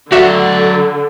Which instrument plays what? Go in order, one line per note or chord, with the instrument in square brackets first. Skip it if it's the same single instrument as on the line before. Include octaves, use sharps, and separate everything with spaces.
[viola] D3 [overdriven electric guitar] F#3 D5 [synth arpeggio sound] F#4 E5